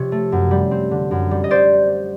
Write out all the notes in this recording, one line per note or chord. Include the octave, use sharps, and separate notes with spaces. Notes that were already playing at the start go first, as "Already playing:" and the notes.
Already playing: C3 F3 C#5
A3
F#2
G3
C4
D3
F#2
G3
D#5
C5 D5